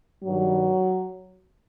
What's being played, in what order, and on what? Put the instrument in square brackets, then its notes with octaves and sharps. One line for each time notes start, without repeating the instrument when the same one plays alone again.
[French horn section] G2 D#3 F#3